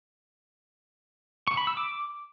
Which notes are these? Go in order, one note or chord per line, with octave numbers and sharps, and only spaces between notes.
C#6
B5
E6
D6